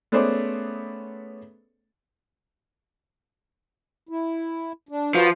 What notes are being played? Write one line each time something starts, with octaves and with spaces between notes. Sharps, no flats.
A3 B3 C#4 G#4 C5 D5
E4
D4
F3 F#4 B4 C#5